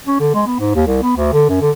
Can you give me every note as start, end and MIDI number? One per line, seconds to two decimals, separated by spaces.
0.07 0.19 61
0.20 0.34 50
0.35 0.42 56
0.47 0.55 59
0.60 0.72 44
0.75 0.84 39
0.87 0.99 36
1.03 1.16 59
1.17 1.30 38
1.33 1.46 50
1.49 1.57 42
1.61 1.71 50